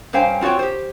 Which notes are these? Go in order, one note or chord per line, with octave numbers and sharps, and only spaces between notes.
G2 C#4 C5 F5 G5 G#5
C4 F4 F#4 C#5 G5
G4 C5